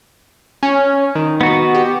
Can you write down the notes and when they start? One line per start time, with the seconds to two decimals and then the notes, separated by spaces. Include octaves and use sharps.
0.63 C#4
1.15 D#3
1.41 B3 F#4
1.75 G4